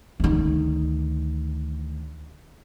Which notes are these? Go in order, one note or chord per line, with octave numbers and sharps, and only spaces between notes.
D2 D#3